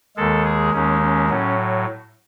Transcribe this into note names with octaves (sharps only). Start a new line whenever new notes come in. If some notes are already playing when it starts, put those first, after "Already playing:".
D#2 D#3 G#3 A4
G#4
D#2 D#3 G#3 C#4
C#4
A2 F#3 C#4